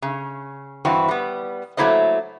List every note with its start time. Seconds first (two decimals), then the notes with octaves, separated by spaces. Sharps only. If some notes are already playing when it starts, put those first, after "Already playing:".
0.02 C#3
0.85 G2 E3 C4 E4 F#4
1.08 G3 B3
1.77 F#3 A3 A#3 E4 C5 D#5